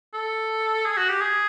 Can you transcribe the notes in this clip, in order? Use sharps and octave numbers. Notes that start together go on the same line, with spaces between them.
A4
G#4
F#4
G4
G#4